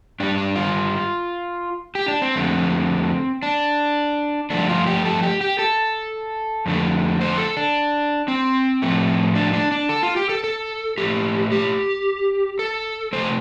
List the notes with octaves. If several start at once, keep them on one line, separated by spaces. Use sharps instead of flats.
G2 G3 D4
D4
F4
G4
D4
C4
F2 D3 A3
D4
G2 F3 A3 D4
F4
G4
A4
G4
G4
A4
F2 D3 A3
C5
A4
D4
C4
A2 F3 A3
D4
D4
D4
A4
F4
G4
A4
A4
A2 A3 G4
G4
A4
C3 A3 C5